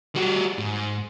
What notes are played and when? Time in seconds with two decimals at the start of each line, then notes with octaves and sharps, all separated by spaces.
0.16 G3 F#4
0.58 G#2